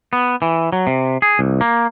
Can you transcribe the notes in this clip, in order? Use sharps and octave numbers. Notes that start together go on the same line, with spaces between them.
B3
E3
F#3
C3
G#4
C2
A#3